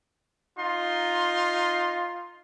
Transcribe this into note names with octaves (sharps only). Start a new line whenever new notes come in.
D#4 F4 C6